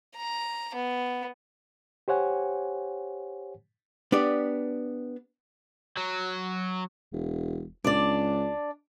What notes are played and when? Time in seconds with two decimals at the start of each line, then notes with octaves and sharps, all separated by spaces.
0.16 A#5
0.75 B3
2.08 G4 C5 C#5 F#5 G#5
4.12 B3 D4 G4 D5
5.97 F#3
7.12 E1
7.84 C#2 D4 D5